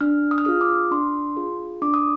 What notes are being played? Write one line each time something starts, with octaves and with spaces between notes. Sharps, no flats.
D4 F6
D#6
F6
F4 G#4 D#6
D6
D4 C6
F4 G#4
D4 D6
D#6